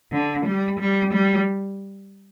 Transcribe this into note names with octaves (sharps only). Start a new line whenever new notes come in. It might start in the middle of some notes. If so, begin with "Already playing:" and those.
D3
G3
G3
G3